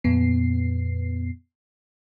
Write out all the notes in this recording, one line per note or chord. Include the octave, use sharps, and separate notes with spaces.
F2 A#2 B3 C7